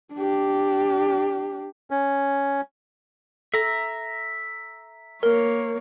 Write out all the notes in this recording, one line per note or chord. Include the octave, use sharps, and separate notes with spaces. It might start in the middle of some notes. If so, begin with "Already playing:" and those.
D4 G4
C#4
A4 E5 A#5
A#3 A#4 C#5